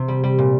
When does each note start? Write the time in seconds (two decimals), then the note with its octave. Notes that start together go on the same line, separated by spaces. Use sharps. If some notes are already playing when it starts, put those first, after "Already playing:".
Already playing: C3
0.08 G3
0.24 G3
0.38 A#2